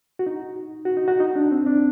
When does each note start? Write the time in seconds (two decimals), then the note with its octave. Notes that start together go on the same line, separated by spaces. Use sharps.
0.19 F#4
0.26 D#4
0.85 F#4
0.97 D#4
1.08 F#4
1.20 D#4
1.36 D4
1.51 C4
1.66 D4